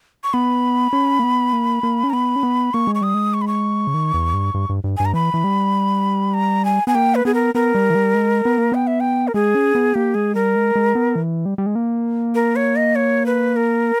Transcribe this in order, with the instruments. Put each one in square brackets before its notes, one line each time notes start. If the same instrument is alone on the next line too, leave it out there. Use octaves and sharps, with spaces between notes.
[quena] C#6
[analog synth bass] B3 [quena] B5
[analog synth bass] C#4
A#3
B3
A#3
A#3
C#4
[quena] A#5
[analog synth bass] B3 [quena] B5
[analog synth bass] C#4
B3
[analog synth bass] A#3 [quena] C#6
[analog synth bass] G#3
[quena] C#6
[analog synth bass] G3 [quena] D#6
[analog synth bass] G#3
[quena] C#6
B5
C#6
[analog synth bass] C#3
D#3
E2
G2
G2
G2
G2
[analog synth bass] G2 [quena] G#5
[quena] A#5
[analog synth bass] E3 [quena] B5
[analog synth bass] E3
G3
[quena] A#5
G#5
[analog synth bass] B3 [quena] G#5
[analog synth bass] A#3 [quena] G5
[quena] B4
[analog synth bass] B3 [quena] G#4
[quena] A#4
[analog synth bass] B3 [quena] A#4
[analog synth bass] G3
E3
G3
G#3
B3
A#3
[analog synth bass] B3 [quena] G5
[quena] E5
G5
A#4
[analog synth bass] G#3 [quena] G#4
[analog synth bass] C#4
B3
[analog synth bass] A#3 [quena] G4
[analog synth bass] G#3 [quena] G#4
[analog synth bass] G3 [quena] A#4
[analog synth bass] G#3
G#3
B3
E3
G3
G3
G#3
A#3
[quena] A#4
C#5
D#5
C#5
B4
A#4